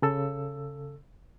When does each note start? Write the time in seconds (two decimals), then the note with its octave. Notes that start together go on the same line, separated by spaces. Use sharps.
0.02 C#3 A4 E6